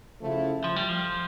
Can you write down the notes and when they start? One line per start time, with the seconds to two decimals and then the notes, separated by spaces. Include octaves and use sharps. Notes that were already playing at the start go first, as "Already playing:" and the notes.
0.20 C#3 F3 A3 E4
0.64 F3
0.76 G3
0.89 F3